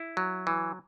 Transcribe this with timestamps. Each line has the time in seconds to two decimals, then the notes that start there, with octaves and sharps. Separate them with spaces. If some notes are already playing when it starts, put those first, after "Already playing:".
Already playing: E4
0.17 F#3
0.47 E3